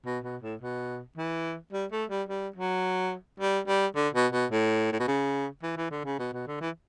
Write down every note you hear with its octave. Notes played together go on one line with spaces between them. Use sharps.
B2
B2
A2
B2
E3
G3
A3
G3
G3
F#3
G3
G3
D3
B2
B2
A2
A2
B2
C#3
E3
E3
D3
C#3
B2
B2
D3
E3